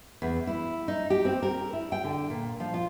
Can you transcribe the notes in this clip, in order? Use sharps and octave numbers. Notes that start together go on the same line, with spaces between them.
E2
E4
D#4
G4
C4
A#4
E4
G5
D3
A#2
F3
F4